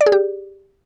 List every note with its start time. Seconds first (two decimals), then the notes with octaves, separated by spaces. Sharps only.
0.01 D5
0.06 G#4
0.12 G4